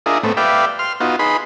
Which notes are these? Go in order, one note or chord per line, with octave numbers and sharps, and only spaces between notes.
D4 F4 G#4 A#4 D#5 E5
A2 A3 B3 C4
G4 B4 D5 E5 F5 G5
C6 F6
B3 D#4 F4 F#4
D#4 G#4 B4 B5 C6